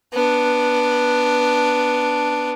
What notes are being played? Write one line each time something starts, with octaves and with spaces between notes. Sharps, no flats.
B3 D4